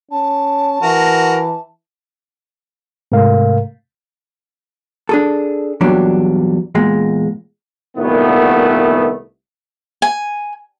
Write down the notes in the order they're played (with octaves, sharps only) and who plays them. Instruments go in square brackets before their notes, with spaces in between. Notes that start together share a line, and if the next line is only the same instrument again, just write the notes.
[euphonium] C#4 [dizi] A5
[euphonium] E3 [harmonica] F#4 A#4
[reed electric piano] G#2 C3 A3 A#4 F5
[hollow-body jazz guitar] D4 G#4 A4
E2 A#2 F#3 G3 D4
E2 A#2 G#3
[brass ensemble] C2 A#2 D#3 A3 B3
[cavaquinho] G#5